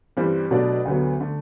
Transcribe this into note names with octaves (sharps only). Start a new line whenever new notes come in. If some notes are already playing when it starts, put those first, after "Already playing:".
G2 E3 G3 C4 G4
B2 F#3 A3 D4 F#4
D2 D3 F#3 B3
D3 A3